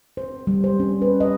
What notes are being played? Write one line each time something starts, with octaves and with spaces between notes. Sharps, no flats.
C5
G3
C5
C#4
B4
D#5